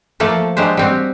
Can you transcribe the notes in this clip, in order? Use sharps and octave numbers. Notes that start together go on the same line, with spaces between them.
F3 A3 A#3 A4
F#3 G#3 D4 G4 C5
G3 C4 F#4